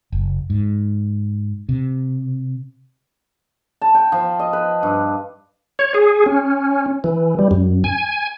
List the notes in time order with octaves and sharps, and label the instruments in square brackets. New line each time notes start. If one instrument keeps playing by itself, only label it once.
[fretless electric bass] F#1
G#2
C3
[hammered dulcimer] A5
G5
F3
D#5
B4
G2
[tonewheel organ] C#5
G#4
C#4
E3
G3
F#2
G#5